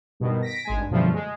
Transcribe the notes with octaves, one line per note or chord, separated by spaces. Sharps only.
G2 B2 D#3
A#6 B6 D7
G#1 G#3 G#5
G2
F#2 B2 D3 F3 G3 A3
G#3